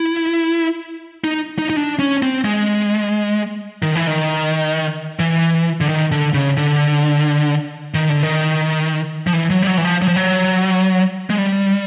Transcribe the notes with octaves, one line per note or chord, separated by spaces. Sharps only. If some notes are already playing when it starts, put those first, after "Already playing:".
Already playing: E4
D#4
D#4
D#4
D4
C#4
C4
G#3
D#3
E3
D#3
E3
D3
D#3
D3
C#3
D3
D#3
D3
D#3
F3
E3
F#3
G3
F#3
E3
F3
F#3
F3
F#3
G#3
G3